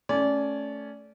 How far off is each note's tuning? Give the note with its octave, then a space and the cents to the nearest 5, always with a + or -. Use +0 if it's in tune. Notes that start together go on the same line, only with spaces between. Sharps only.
A3 -10 C#4 +0 D5 -20